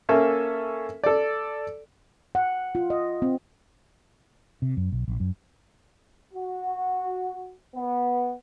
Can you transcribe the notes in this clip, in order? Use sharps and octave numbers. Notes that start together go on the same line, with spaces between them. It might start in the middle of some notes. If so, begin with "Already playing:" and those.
A#3 C#4 A4 E5
A4 D5
F#5
F4
D#5
C4
C3
F#2
B1
A#1
F#2
F#4
B3